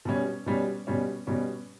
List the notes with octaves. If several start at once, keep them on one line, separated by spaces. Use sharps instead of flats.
B2 G3 C#4
B2 G3 C#4
B2 G3 C#4
B2 G3 C#4